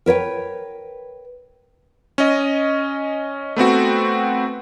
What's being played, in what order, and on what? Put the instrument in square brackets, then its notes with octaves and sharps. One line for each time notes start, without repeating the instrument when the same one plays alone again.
[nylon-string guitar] A#4 B4 C#5 G5
[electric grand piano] C#4 D#5
A3 B3 C4 F#4